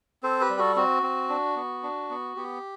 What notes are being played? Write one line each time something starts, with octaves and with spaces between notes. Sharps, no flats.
C4 A4 C5
G4 B4
G3
F#4 A4
C4 F#4
C4
D4
B3
D4
B3
B3 G4